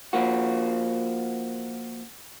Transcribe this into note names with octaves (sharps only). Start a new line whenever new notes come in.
F3 A#3 F#4